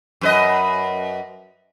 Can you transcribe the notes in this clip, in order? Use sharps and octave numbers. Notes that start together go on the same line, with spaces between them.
F#2 B4 D#5